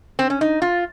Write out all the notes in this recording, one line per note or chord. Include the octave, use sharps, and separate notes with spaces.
C4
C#4
D#4
F4